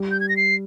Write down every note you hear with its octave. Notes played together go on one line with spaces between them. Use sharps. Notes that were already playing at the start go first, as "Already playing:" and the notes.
Already playing: G3
G6
G#6
A#6
C7